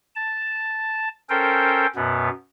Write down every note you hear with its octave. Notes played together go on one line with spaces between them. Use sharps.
A5
C#4 A4 A#4 C5 G5
F#2 B2 B3